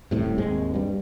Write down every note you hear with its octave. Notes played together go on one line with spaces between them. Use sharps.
D#1 C2 A2 C3
G#1 D#2 G#3 C4
G2 G3